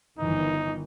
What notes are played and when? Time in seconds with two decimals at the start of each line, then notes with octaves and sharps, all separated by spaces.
0.18 G1 D#3 E3 D#4